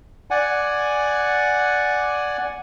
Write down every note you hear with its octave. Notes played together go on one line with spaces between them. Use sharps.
D5 F#5 G#5